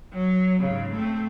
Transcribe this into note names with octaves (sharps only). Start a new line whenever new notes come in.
F#3
G#2 C#3
A3 C4